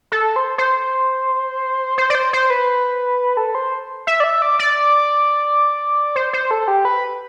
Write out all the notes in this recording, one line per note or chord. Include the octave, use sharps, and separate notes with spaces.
A4
C5
C5
C5
D5
C5
C5
B4
A4
C5
E5
D5
E5
D5
D5
C5
C5
A4
G4
B4